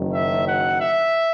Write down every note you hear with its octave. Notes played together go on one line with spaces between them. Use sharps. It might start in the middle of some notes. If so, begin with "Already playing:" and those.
Already playing: F#1 F#2 D#3
E5
F#5
E5